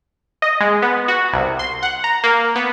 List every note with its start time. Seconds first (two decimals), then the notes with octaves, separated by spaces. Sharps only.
0.42 D#5
0.60 G#3
0.82 B3
1.08 F#4
1.33 C2
1.59 C6
1.83 F#5
2.04 A#5
2.24 A#3
2.56 B3